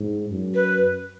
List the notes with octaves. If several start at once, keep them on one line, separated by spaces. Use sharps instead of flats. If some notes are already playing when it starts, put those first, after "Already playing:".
Already playing: G#2
F#2
B4